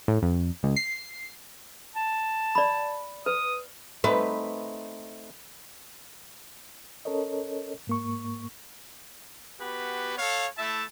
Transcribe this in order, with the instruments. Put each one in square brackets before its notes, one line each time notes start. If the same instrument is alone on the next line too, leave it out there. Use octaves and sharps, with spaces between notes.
[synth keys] A2
F2
C#2
C7
[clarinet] A5
[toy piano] D5 B5
[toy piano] B4 [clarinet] D#6
[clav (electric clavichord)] A3 C4 D#4 [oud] B4
[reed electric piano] C#4 A4 A#4 C#5 D#5
G#2 A#3 C#6
[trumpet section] B3 F#4 G4 B4
A4 C#5 F5
A3 E4 E5 A5